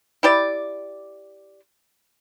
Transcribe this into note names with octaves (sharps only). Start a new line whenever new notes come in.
E4 G4 D5